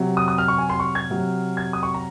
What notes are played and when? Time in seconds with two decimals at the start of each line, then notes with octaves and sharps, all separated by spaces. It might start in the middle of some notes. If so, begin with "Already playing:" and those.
Already playing: C3 F#3
0.17 D#6
0.28 D#6
0.38 F6
0.48 C#6
0.58 G#5
0.70 C6
0.80 C#6
0.95 G#6
1.10 C3 F#3
1.57 G#6
1.73 D#6
1.83 C#6
1.94 A#5